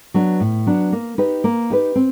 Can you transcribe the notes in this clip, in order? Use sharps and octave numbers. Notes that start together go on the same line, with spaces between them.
F#3 B3 D4
A2
F#3 B3 D4
A#3
D#4 G4 B4
A#3
D#4 G4 B4
C4